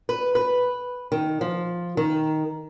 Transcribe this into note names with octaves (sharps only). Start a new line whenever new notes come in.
B4
B4
D#3
F3
D#3